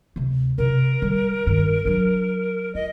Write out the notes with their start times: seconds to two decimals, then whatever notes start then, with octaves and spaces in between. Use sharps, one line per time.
0.16 D2 C3
0.58 C3 F4 A#4
1.02 D3 G3
1.46 G2 D#3
1.85 F#3 D4
2.75 F4 D#5